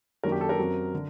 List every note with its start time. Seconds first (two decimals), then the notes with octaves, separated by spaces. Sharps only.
0.24 F#2 D#3 F#3 A#3 D4 A#4
0.32 G4
0.41 A4
0.49 A#4
0.59 F#2 F#3 C4
0.94 D3